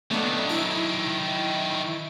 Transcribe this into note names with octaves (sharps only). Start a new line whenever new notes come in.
D#3 F#3 A3 B3 D4
E4 D7